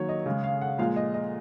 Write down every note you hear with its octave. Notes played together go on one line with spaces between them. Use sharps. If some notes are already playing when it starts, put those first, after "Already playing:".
Already playing: D#3 F#3 A#3 C#5
D#5
C#3 G#3
F5
F#5
A#2 F3 G#3 F5
D#5
D#5